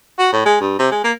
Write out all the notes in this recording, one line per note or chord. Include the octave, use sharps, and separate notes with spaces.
F#4
A2
G#3
G2
C3
G#3
A#3